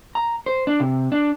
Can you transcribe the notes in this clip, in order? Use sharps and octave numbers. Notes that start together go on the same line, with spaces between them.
A#5
C5
D4
C3
D4